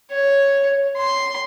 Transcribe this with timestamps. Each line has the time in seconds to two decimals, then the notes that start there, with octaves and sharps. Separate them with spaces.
0.11 C#5
0.97 C6